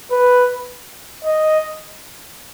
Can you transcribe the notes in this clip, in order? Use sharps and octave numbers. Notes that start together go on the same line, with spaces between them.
B4
D#5